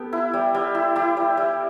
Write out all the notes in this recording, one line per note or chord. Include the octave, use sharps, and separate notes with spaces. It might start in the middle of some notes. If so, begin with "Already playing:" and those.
Already playing: B3 G4 A4
E4
G3
G3
E4
E4 G4
G3
G3